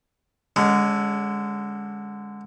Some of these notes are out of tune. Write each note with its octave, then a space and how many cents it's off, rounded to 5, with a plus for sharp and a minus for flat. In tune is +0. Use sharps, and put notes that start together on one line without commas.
D3 +0 G#3 -15 C#4 +20